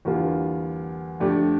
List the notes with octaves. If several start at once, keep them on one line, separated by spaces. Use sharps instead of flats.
E2 D3 G3 A#3 F4
F2 D3 A3 D4 G4